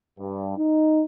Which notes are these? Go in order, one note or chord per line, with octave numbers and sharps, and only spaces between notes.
G2
D#4